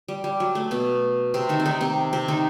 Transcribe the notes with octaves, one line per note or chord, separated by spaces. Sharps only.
G3
G3
F#3
A3
B2 B3
C3 C4
D#3 D#4
C4
D#3 D#4
C3 C4
C3 C4
D#3 D#4